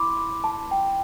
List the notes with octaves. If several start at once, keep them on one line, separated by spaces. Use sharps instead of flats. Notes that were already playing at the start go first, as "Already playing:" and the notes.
Already playing: E4 B5 C6 D6
A5
G5